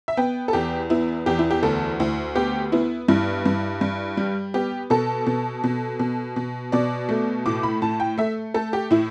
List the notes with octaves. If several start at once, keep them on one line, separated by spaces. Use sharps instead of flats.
E5
B3 G5
A4
E2 G4
B3 E4
E2 G4
E4
G4
D2 A4
D2 E4
B3 G4
B3 E4
G2 E4
G2
G2
G3
B3 G4
B2 A4
B2
B2
B2
B2
B2 D5
A3
A2 D6
B5
A2 A5
G5
A3 E5
A3 A4
G4
A2 E4